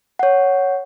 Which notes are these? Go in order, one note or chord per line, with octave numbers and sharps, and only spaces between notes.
C#5 F#5